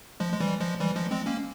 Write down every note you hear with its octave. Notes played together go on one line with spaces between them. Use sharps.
F3 G#3
G#3
E3 G3
F3 G#3
E3 G3
F3 G#3
G#3 C4
A#3 C#4